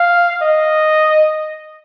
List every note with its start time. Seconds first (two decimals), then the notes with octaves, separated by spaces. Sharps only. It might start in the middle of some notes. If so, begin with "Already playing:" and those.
Already playing: F5
0.42 D#5